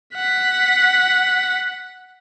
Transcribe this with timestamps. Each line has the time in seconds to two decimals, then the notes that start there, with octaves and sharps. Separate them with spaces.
0.16 F#5 B6